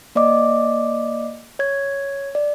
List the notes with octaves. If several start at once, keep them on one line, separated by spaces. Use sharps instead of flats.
A#3 D5 D#5 D6
C#5 G#6
D5